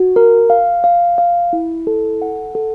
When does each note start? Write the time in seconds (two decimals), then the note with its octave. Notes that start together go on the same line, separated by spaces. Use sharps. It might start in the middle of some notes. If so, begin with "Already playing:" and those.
Already playing: F#4
0.16 A#4
0.50 F5
0.84 F5
1.18 F5
1.53 E4
1.87 A4
2.22 F#5
2.55 A4